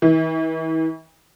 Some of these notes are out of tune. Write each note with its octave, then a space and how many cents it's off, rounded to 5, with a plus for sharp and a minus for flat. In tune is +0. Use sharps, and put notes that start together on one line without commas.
E3 -45